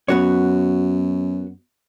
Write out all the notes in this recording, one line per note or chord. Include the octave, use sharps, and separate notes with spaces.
F#2 B3 F#4 C#5